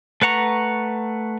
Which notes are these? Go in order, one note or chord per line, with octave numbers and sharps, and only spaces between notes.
A3 B4 F#5 A#5 C#6